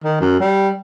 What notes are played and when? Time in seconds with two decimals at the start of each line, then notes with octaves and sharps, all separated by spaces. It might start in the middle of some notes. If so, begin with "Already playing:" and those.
0.04 D#3
0.21 F#2
0.40 G3